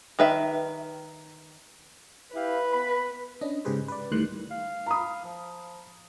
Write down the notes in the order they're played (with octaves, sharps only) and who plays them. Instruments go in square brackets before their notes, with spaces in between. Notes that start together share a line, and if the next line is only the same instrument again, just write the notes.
[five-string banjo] D#3 B4 E5
[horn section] E4 G4 F5 [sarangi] B4
[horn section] B3 B5
[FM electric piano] C#4 D4 D#5
G#2 C#3 G4 G#4 B4 C5
B4 D5
D2 A2 D#3 G3 C6 F#6
[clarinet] F5
[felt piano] A#5 B5 D#6
[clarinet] F3